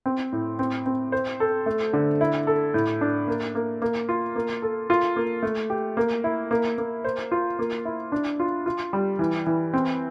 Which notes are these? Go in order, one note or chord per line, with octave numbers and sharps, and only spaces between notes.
C4
A2
C4
C4
C5
A4
A3
D3
E4
A4
A2
D4
A#3
A#3
A#3
F4
A#3
A4
F4
A#3
A3
G4
A#3
E4
A#3
A#3
C5
F4
A#3
E4
D4
F4
F4
G3
E3
E3
C4